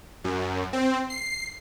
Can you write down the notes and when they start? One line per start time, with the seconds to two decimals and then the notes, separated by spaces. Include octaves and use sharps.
0.24 F#2
0.73 C4
1.10 C7